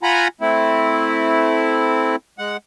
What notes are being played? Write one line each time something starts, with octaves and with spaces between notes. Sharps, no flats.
F4 F#5 G#5 A#5 B5
A3 C4 E4
G#3 F#5